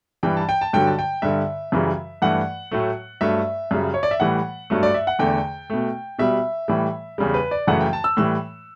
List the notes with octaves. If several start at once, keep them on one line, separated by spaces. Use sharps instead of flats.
G2 E3 G3 G5
A5
G5
A5
G2 D3 F#3 G5
A5
G5
G2 D3 G3 E5
F#2 C#3 E3 G3
G2 E3 A3 F#5
A2 F#3 A3
G2 F#3 A3 E5
F#2 C#3 G3
C#5
D5
E5
A2 E3 G3 F#5
G2 F#3 A3
D5
E5
F#5
E2 D3 A3 G5
B2 A3
B2 G3 E5
A2 E3 G3
E2 C#3 G3
B4
D5
F#2 C#3 E3 A3 F#5
G5
A5
E6
A2 E3 G3 E6